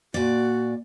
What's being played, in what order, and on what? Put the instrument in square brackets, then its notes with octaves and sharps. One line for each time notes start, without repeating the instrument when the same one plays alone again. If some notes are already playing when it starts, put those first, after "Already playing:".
[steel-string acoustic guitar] A#2 D5 [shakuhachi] F#4